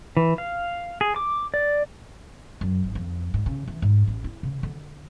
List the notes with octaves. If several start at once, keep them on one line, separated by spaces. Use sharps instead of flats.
E3
F5
G#4
D6
D5
F#2
G#1
F2
G#2
C#3
E3
G#2
A1
E4
C#3
D3